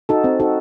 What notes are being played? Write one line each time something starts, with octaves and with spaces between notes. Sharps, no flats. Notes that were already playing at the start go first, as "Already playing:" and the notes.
D#4 F#4 A4
C4
D#4 F#4 A4